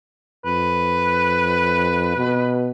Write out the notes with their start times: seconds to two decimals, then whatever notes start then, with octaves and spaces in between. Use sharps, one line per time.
0.45 F2 B4
2.16 B2